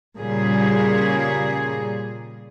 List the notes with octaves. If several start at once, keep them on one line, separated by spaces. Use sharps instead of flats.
A#2 C#3 G3 G#4